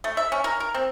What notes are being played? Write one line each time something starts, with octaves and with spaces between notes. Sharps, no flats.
A3
E5
C#4
A#4
A#4
C4